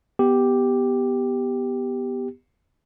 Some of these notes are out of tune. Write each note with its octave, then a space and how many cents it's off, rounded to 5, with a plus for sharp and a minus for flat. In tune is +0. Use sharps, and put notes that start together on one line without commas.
B3 +0 G4 +0